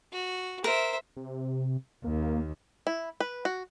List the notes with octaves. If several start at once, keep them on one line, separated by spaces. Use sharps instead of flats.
F#4
A#4 C5 E5
C3
D#2 A#3
E4
B4
F#4